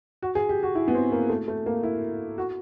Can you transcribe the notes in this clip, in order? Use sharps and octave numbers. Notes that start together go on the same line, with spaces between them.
F#4
G#4
G4
F#4
E4
B3
C4
A#3
A3
A3
A#3
E4
F#4